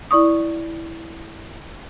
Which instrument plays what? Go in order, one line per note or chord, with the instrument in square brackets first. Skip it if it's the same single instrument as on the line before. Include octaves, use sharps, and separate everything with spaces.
[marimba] E4 D5 C#6 D#6